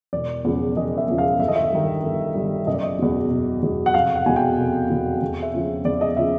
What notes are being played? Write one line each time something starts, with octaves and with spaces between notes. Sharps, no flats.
E1 D5
E2 C#3 F3
E1 D#5
E5
E2 C#3 F3
F5
G1 E5
D#5
E5
G2 D#3
G1
G2 D#3
F#1 D#5
D5
D#5
E2 B2
F#1
E2 B2
F#5
F1 F5
F#5
E2 B2 G#5
G5
F1
E2 B2
E2
E5
C#3 F3
E2 D5
D#5
C#3 F3 E5